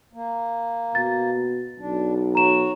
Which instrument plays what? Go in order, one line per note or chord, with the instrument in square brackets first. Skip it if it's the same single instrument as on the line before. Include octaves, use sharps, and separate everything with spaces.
[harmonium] A#3
[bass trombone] B2 [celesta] A6
[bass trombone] B1 [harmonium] D4
[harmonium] F#4 C#5 [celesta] A#5 E7